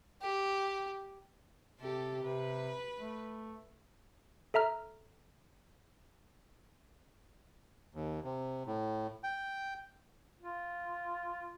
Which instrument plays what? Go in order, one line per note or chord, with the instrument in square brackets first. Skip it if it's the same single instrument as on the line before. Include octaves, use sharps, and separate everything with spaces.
[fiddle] G4
[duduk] C3 [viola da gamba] C4 G4 A4
[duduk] C3 [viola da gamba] B4
[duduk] A3
[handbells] A4 E5 A#5 F6
[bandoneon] D#2
C3
A2
G5
[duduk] F4